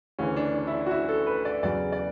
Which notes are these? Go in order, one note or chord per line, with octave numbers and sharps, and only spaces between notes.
D2 C#3 E3 C#4
D4
D4
E4
D4
F#4
E4
A4
B4
D5
E2 C#3 F#3 D5
D5